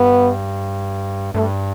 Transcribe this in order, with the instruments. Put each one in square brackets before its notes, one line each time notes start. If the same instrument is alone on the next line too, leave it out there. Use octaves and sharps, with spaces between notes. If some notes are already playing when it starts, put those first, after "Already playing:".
Already playing: [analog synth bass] G2 [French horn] B3
[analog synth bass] G2 [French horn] A3